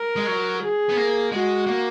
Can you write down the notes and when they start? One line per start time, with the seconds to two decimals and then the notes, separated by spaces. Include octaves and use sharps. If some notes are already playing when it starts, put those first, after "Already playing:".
Already playing: A#4
0.16 G#3
0.27 F#3
0.61 G#4
0.89 B3
0.97 A#3
1.31 G#3 F#4
1.67 A#3